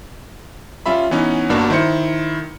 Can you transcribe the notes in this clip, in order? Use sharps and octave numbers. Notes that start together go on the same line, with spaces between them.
G3 C#4 F4 E5 B5
E3 B3 C#4 D#4
G1 G2 A#3 D4 F#4
D#3 E4 C5 C#7